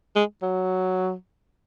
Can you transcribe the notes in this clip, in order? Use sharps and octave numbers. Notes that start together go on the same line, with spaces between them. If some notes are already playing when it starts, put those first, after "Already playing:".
G#3
F#3